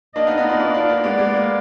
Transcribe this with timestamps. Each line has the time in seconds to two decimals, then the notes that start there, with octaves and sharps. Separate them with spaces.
0.16 A#3 D4 D#5
0.26 B3 D#4
0.37 B3 D#4
0.49 D4 F4
0.59 D4 F4 D5
0.74 D4 F4
0.89 A#3 D4
1.03 G#3 B3 D5
1.18 G#3
1.33 A#3